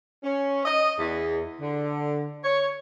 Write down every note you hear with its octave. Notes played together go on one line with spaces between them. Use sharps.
C#4
D#5
E2
D3
C#5